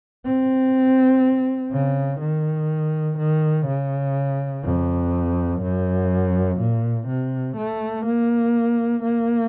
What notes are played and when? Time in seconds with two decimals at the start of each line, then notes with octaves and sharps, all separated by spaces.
0.25 C4
1.72 C#3
2.21 D#3
3.18 D#3
3.67 C#3
4.64 F2
5.62 F#2
6.59 A#2
7.08 C3
7.57 A3
8.06 A#3
9.04 A#3